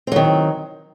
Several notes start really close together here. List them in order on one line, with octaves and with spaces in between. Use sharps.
C4 F#3 D#3